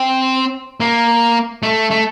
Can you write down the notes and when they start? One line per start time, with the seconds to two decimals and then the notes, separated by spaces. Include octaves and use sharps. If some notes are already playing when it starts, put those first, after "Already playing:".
Already playing: C4
0.80 A#3
1.63 A3
1.91 A3